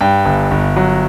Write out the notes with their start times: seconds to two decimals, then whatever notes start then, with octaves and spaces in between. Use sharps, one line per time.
0.01 G2 G5
0.25 G1
0.51 G1
0.76 F#3